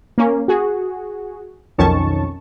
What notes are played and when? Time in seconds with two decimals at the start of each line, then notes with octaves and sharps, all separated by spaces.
0.18 A#3 C#4
0.48 F#4 G#4
1.78 B1 F2 D#3 C#4 A5 C#6